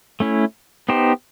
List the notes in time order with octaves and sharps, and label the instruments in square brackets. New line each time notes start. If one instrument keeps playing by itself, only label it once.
[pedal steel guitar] A3 C#4 E4
B3 D#4 G4 C5